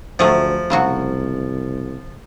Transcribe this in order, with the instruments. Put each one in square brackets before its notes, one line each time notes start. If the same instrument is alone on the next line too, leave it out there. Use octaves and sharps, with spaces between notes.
[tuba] D2 [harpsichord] F3 [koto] F#3 A3 G#4
[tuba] C2 [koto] C#3 F#3 F#4